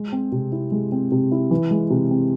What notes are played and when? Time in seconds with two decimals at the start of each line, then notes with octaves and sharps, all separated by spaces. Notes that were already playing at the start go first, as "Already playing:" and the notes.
Already playing: G#3
0.12 C4
0.32 C3
0.52 E4
0.72 G#3
0.92 C4
1.12 C3
1.32 E4
1.51 E3
1.71 G#3
1.90 C3
2.11 C4